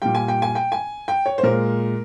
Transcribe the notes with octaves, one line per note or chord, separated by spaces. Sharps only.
A#2 G3 G5
G#5
G5
G#5
G5
G#5
G5
C#5
C5
A#2 G#3 A#4